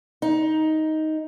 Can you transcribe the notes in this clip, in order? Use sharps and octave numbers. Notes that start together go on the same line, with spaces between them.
D#4